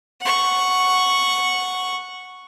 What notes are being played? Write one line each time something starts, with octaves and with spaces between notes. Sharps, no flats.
F#5 C#6